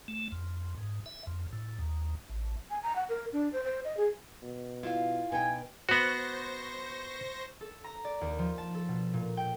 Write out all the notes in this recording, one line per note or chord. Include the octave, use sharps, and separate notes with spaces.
A3
F2
G#2
E5
F2
A2
D#2
A1
G#5
A#5
F#5
A#4
D4
C5
C5
D#5
G#4
B2
E4 F4 F5
B2 D#4 G5 G#5
B3 F#4 C5 C#6 A#6
A4
A#5
D5
D#2
F3
A5
A4
B2
A#2
G5